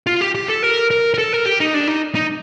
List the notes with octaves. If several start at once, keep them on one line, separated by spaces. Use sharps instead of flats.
F4
G4
G4
A4
A#4
A#4
A#4
A4
A#4
G4
D#4
D4
D#4
D#4